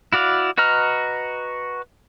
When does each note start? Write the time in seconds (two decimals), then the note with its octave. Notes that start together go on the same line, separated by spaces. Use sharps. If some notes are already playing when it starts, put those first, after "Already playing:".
0.13 E4 F#4 D5 F5
0.58 F#4 B4 D#5 A#5 F6